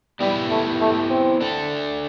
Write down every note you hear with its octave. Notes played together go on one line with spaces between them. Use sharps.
G3 B3 E4 G4 B4
A3
A3
C4
A3 D4 A4